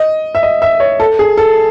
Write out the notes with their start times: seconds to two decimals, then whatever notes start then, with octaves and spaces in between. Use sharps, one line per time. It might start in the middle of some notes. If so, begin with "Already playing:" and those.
Already playing: D#5
0.35 E5
0.43 D#5
0.62 E5
0.80 C#5
1.00 A4
1.19 G#4
1.37 A4